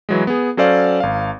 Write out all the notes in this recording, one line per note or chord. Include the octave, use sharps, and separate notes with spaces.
E3 F#3 G#3
B3 G#4
F#3 C#4 A4 C5 D5 F5
G#1 F5